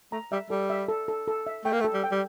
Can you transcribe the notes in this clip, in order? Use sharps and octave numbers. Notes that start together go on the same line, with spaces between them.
A3 A#5
G3 E5
G3 A4
E5
A4
A4
A4
E5
A3 G5
A#3
A3
A4
G3
G5
G3